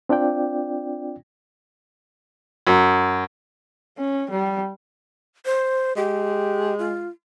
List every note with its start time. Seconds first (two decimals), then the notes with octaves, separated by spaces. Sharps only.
0.09 C4 D4 F4 D5 G5
2.67 F#2
3.98 C#4
4.31 G3
5.46 C5
5.97 G#3 G4
6.79 F4